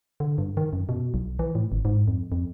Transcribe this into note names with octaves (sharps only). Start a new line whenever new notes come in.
D3
G2
D#3
F#2
B2
B1
E3
A2
G#1
G#2
F2
F2